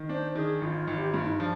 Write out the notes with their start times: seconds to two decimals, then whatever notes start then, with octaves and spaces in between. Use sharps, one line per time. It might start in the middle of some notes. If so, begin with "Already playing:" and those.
Already playing: D#3
0.09 D4 C5
0.35 D#3 G#4
0.61 G#1 F4
0.87 G#1
0.98 G4
1.12 G2 F4
1.26 D#4
1.39 F3 D4